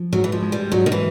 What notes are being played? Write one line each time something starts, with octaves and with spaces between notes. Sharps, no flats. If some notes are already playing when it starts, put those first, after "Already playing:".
Already playing: F3
G#2 F#3
E3
F3
G#3
G3
G#2 F#3
D#3
E3